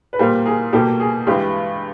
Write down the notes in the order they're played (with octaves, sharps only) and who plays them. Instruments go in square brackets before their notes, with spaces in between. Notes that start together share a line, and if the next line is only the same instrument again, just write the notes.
[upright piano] B4
A#2 G3 A#3 A#4 C5
G#4 A#4
B2 G3 A#3 G4 A4
G#4
G2 E3 G#3 G4